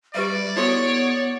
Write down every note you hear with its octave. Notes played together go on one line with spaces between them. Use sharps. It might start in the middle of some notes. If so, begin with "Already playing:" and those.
G3 G4 B4 D5 E5
B3 E4 F#4 A4 C#5